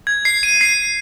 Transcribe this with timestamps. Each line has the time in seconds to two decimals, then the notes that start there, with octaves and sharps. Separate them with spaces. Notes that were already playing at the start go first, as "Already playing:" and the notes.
0.07 G#6
0.25 C7
0.43 D#7
0.61 C7